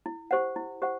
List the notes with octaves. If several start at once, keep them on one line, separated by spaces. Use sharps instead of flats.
E4
G4 C5 F#5
E4
G4 C5 F#5